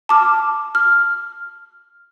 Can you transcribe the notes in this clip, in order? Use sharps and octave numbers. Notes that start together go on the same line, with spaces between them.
A5 D6 F6
F6